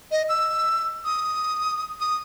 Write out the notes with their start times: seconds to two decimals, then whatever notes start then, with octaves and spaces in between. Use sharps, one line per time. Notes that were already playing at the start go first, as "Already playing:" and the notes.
0.11 D#5
0.29 E6
1.05 D#6
2.00 D#6